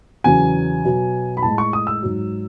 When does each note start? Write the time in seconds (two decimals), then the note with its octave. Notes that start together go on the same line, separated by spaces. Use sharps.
0.24 E2 C#3 F#3 G#5
0.85 B2 F#3
1.37 B5
1.43 A2 G#3 A5
1.58 C#6
1.73 D#6
1.87 E6
2.02 G#2 F#3